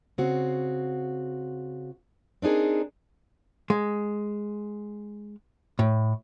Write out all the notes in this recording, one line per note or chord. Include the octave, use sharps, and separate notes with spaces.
C#3 C4 F#4
C4 D4 D#4 G#4 A#4
G#3
A2